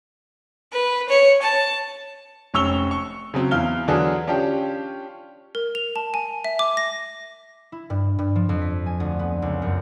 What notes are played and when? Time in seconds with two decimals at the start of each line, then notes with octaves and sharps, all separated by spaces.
0.72 B4
1.09 C#5
1.42 A5
2.54 F1 C#4 C#6 E6 F7 G7
2.91 C#6
3.34 C#3 F#3 C4
3.51 E2 E4 F5 F6 G7
3.88 D3 E3 F#3 D4 G#4
4.27 C#4 D4 F4 G4
5.55 A#4
5.75 F7
5.96 A5
6.14 G#5
6.44 E5
6.59 D6
6.77 A#6
7.72 E4
7.90 G2
8.19 G2
8.36 F3
8.49 F2
8.62 B6
8.86 G#5
9.00 D2
9.19 B3
9.42 C#2
9.62 F#2